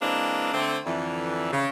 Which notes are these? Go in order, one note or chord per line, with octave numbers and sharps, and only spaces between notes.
E3 G#3 A#3 C4 D4
D3 A3 C4
F2 D3 E3
C#3